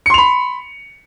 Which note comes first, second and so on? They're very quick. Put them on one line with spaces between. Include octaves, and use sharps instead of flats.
C#7 C6 F7 B5